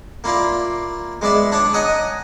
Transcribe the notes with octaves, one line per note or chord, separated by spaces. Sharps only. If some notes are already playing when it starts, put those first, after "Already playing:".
A#3 E4 F4 D5
G#3 B3 D5 E5
D4 C#5 D5
C#5 D#5 F#5 G#5 A#5 D#6